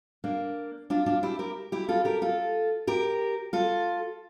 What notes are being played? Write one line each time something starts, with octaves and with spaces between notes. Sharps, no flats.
A#3 D4
D4 F4
D4 F4
E4 G4
G4 A#4
E4 G4
F4 A4
G4 A#4
F4 A4
G4 A#4
F4 A4